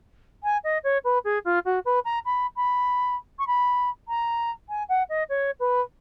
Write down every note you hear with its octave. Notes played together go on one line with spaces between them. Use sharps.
G#5
D#5
C#5
B4
G#4
F4
F#4
B4
A#5
B5
B5
C#6
B5
A#5
G#5
F#5
D#5
C#5
B4